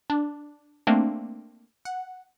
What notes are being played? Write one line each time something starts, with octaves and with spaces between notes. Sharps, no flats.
D4
A3 A#3 C4 D4
F#5